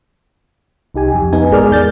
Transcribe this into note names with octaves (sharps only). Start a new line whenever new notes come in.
C2 D#4 G4 G#5
F2
B3 D#4 G#5
A1 G#3 G#4 A#4 D5 F6
E2 G6 A6